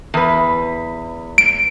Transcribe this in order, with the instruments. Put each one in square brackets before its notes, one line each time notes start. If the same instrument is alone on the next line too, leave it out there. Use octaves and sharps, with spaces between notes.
[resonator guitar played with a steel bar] E2 B4
[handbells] D7